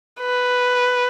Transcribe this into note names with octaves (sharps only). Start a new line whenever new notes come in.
B4